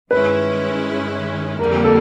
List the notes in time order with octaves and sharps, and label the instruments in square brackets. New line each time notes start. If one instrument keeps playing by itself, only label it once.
[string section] G2 D#3 G#3 C#4 E4 [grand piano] B4
[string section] F2 D3 G3 A#3 [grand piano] A#4
[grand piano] A4